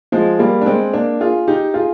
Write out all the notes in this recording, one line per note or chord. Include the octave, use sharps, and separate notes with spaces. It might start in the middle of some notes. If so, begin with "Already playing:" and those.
F3 G#3
G3 A#3
D4
G#3 C4
A#3 D4
F4 G#4
D#4 G4
F4 G#4